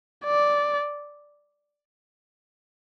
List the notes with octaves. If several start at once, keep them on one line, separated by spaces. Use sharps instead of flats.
D5